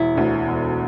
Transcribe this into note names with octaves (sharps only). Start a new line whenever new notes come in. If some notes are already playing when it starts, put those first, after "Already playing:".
Already playing: E1 E4
D2 D3
E1